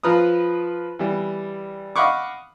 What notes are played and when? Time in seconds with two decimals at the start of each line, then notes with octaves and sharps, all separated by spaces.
0.03 F3 F4 B4 A#5 D#6
0.99 E3 G3
1.96 D#5 F5 F#5 B5 C#6 D6